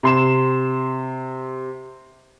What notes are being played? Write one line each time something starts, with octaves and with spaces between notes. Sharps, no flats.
C3 C6 E7